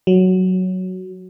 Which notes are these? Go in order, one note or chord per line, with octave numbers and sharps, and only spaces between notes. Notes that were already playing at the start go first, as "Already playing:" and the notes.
F#3